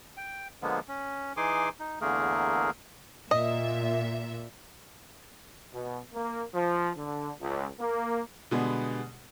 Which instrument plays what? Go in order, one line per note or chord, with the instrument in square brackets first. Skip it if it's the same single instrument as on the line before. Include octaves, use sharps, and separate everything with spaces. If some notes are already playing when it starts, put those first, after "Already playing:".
[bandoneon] G5
D3 F3 G#3 A#3 B3
C#4
E3 D#4 G#4 G#5 C6 D6
D#4
E2 D3 A3 A#3 G#4 A#4
[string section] A#2 E5 [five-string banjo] D#5
[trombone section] B2
A#3
F3
D3
C#2
A#3
[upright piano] B2 D3 G3 G#3 B3